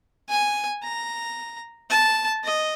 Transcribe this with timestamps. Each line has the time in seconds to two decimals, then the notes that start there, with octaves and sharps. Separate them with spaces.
0.29 G#5
0.83 A#5
1.90 A5
2.44 D#5